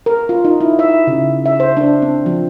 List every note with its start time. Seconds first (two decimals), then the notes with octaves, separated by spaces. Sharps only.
0.06 A#4
0.29 F4
0.45 D#4
0.61 E4
0.79 E5
1.07 C#3
1.46 E5
1.60 C5
1.77 D4
2.02 C4
2.26 F3